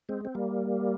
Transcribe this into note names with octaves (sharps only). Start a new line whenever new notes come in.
G#3 C4
C4
G3 A#3